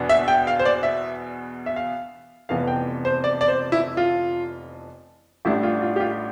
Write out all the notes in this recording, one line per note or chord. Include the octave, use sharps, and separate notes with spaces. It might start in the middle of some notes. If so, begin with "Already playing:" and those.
Already playing: E2 B2 B3 D4
E5
G5
F5
C5
D5
E5
E5
F5
F1 F2 E3 B3 F5
G5
C5
D5
D5
C5
E4
F4
A1 A2 G3 D4 E4
F4
F4
G4
F4